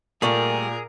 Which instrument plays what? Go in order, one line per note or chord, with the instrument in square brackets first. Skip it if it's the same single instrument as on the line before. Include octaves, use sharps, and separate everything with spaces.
[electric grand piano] A#2 [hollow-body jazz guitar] G3 A3 A#3 [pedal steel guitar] G#4 [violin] A#4